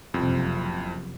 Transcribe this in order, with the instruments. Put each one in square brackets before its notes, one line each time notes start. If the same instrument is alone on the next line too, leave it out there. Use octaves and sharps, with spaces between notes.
[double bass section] F#1 C3 F3 [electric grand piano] C2 F2